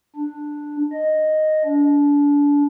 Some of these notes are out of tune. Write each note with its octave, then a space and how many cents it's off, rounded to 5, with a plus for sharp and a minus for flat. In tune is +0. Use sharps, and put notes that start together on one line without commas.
D4 +5
D#5 -5
D4 -30